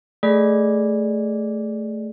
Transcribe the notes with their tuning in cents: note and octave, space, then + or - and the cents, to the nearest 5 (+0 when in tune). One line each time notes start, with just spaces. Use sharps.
A3 +0 G#4 +0 D5 -5